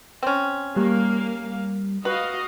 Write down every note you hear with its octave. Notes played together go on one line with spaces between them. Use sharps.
C4 C#4
G3 A#3 F5
F#4 B4 D#5 F5